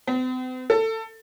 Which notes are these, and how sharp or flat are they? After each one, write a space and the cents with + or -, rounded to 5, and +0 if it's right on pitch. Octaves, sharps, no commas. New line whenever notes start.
C4 -45
A4 +20